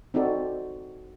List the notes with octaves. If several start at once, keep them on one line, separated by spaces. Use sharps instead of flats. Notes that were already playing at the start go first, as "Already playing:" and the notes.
C4 D#4 F#4 A4 D5